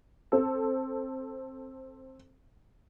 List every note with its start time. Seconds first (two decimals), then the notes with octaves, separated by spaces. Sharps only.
0.32 C4 A4